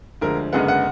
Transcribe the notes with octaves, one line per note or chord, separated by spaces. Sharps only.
D2 D3 F3 G#3 A#4
F#1 F#2 D3 G#3 B3 F#5
F#5